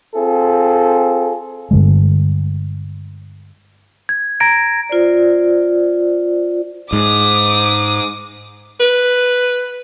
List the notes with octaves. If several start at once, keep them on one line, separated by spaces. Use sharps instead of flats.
C4 F4 G#4 A4
G2 D3 G#3
G#6
A#5 G#6 A#6 D7
F4 C5 D5
G#2 D6 D#6
B4